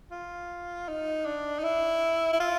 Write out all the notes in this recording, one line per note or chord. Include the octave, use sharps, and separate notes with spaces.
F4
D#4
D4
D#4
E4
E4
F4